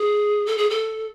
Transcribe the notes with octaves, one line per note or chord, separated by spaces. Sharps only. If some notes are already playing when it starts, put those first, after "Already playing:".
Already playing: G#4
A4
G#4
A4